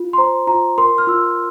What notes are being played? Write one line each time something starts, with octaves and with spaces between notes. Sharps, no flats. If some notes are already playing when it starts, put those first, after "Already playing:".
Already playing: F4
C6
C5 A#5
F4 A#5
A#4 C6
F6
F4 E6